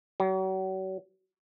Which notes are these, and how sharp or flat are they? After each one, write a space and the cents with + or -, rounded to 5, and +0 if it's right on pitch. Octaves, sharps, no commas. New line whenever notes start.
F#3 +40